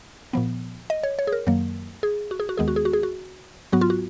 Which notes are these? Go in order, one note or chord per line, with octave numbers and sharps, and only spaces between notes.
A#2 F3 B3
D#5
C#5
C#5
G#4
A#4
F#2 D#3 F#3 A#3
G#4
F#4
G#4
F#4
D#2 D#3 G#3 B3 G#4
F#4
G#4
F#4
G#4
F#4
G#2 F#3 B3 F#4
F4
F#4